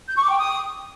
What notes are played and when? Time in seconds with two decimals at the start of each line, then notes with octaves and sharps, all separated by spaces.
0.08 G6
0.15 C#6
0.23 D6
0.31 G5
0.38 D#6